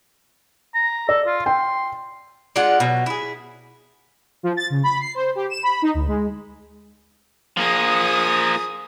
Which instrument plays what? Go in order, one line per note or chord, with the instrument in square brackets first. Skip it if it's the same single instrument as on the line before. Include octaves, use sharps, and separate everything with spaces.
[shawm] A#5
[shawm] A4 [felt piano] D5
[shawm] F4
[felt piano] G5 [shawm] C6
[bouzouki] G#3 D4 F4 F#5
B2 F#3
E4 G#4
[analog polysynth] F3
A6
C#3
B5
C7
C5
G4
E7
B5
D#4
D2
G#3
[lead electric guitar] F3 A#3 [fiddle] G#4 D#6